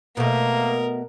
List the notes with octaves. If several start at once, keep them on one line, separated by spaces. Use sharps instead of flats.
B2 A3 A#3 A#4